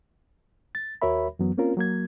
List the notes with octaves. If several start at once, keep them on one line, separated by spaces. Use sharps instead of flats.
A6
D#2 F#4 A#4 C#5 E5 B5
F#2 E3 F#3 B3
A#3 C4 C#4 F4 A#4
F#3 A#3 G#6